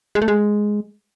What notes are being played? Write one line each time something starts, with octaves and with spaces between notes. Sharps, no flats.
G#3
A3
G#3